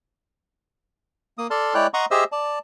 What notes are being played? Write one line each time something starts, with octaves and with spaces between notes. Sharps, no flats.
A#3 D#6
A4 D5 A5 C6 F6
G#3 E4 C#5 D5 G5 F#6
D#5 F#5 A#5 C6 C#6 D#6
G4 G#4 C5 D#5 E5 E6
D5 A5